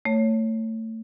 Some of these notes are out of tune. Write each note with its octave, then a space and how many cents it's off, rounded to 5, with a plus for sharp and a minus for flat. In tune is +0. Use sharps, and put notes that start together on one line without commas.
A3 +25 C#5 +0